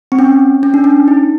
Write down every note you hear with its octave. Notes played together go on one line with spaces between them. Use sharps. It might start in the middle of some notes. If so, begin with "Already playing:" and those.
C4
C#4
C#4
D4
C#4
D#4